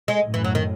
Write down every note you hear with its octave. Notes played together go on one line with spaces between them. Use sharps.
G#3
F#2 A2
E3
F#3
D#3